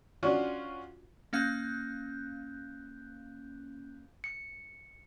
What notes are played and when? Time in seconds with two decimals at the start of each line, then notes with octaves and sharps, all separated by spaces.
0.23 C#4 D4 F4 F#4
1.33 A#3 C#4 F5 F#6 G6
4.24 C#7